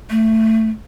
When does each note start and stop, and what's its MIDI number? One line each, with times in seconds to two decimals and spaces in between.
0.10 0.69 57